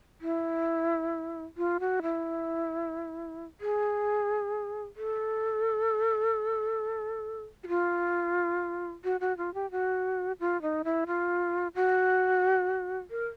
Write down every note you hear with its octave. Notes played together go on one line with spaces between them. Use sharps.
E4
F4
F#4
E4
G#4
A4
F#4
F4
F#4
F#4
F4
G4
F#4
F4
D#4
E4
F4
F#4
A#4